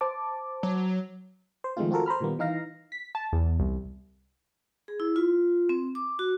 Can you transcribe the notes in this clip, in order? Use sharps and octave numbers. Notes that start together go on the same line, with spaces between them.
C5 A5 D6
F#3
C5
D#3 F3 G#3 A3 C4 F4
C4 F4 F#4 A4 A#4
C5 A#5 B5 F6
A#2 D#3 G3 A#3 B3
E3 D#4 F5 A#6
B6
A5
E2
C2
G#4
E4
F4
C4
D6
F#4